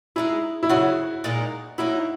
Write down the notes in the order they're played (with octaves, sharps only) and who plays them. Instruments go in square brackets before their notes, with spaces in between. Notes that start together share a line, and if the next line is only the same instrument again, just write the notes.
[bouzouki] G#3 D#4 G#4 [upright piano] E4
[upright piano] E4
[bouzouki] C#3 F#3 C#4 [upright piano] F#4
[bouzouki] A#2 G#3 D#4 A#4
[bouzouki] F#3 A#3 D#4 F#4 [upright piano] E4